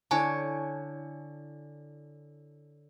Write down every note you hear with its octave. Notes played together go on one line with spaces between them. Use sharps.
D3 E4 C#5 G#5 A5